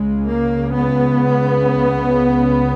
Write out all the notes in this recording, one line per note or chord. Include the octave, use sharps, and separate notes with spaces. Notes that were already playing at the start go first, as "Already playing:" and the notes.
Already playing: C#2 C#3 G#3
A#3
B3